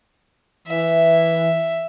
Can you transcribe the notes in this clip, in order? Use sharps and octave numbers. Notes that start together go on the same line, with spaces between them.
E3 E5